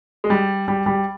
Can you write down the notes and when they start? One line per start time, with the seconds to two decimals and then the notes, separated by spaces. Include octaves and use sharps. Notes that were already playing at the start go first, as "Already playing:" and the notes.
0.24 G#3
0.30 G3
0.68 G3
0.86 G3